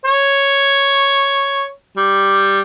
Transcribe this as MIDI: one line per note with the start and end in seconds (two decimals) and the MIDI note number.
0.05 1.67 73
1.97 2.60 55